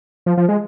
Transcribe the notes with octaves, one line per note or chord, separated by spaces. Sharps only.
F3
F3
G#3